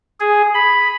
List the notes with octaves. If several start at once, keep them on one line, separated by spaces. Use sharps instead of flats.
G#4
B5